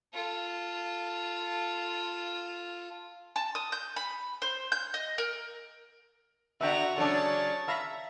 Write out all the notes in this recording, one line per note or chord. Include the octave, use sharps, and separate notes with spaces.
F4 A4
A5
D#6
G6
B5
C5
G6
D#5
A#4
D3 B3 F#4 E5 G5 A#5
C#3 F#3 D4 A4 C#5 D5 A5
E5 F5 A#5 B5